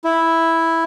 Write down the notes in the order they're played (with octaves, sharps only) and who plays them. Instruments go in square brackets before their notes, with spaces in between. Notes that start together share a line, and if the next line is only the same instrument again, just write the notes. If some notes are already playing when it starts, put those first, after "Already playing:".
[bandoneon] E4